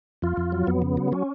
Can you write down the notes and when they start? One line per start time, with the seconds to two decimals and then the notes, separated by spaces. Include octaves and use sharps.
0.22 F2 F4
0.37 F2
0.52 F#3
0.67 F2 B3
0.82 C#3
0.97 F#3
1.12 F#3 C#4